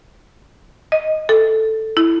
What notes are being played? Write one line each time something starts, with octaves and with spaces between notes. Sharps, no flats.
D#5
A4
E4